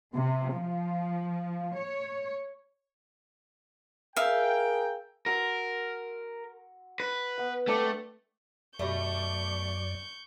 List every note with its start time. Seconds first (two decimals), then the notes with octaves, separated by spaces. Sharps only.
0.14 C3
0.54 F3
1.78 C#5
4.16 G#4 A#4 E5 F5 G5
5.26 F#4 A#4 C6 E6
7.00 B4
7.38 B3 F#5
7.67 A3 C4 D4
8.79 F#2 B2 G3 A3 D5 C#6 G6